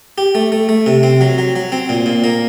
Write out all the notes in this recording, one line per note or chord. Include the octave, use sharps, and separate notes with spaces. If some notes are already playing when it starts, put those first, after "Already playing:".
G4
A3
A3
A3
C3
C4
F#3
F#3
F#3
C4
A#2
A#2
A#3